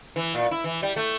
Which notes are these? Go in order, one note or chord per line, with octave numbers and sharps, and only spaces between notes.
E3
A#2
E4
E3
G3
A3